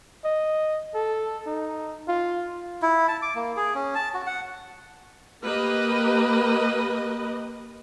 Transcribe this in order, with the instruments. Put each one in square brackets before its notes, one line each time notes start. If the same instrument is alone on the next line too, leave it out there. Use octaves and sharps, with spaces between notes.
[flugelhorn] D#5
A4
D#4
F4
[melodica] E4
A5
D6
A#3
G#4
C#4
A5
F#4
F#5
[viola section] A#3 G4 B4 D#5